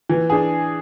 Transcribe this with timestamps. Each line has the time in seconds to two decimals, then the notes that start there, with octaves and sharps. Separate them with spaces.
0.09 E3
0.30 D4 G#4